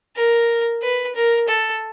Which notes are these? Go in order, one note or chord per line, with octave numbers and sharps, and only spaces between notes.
A#4
B4
A#4
A4